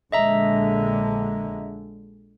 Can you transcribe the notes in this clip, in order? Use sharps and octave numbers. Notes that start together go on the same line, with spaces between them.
A#1 D3 G#3 D#5 E5 A#5